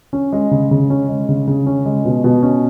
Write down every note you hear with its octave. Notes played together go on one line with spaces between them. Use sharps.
C#4
G#3
C#3
C#3
C#4
G#3
C#3
C#3
C#4
G#3
B2
B2
C#4